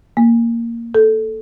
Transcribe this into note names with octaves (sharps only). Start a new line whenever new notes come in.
A#3
A4